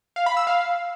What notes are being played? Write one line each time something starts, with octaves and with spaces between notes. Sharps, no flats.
F5
B5
E6
F5